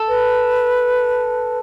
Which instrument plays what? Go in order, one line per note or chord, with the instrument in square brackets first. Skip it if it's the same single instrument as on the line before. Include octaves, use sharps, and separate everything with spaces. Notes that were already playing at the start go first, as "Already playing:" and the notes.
Already playing: [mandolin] A4
[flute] B4